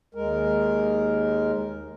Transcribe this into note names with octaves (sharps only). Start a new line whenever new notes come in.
D#2 G#3 A#4